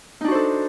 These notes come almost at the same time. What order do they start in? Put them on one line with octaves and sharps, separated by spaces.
D#4 D4 F#4 C5 A4